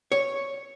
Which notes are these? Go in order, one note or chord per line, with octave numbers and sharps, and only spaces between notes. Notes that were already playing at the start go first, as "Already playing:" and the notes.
C#5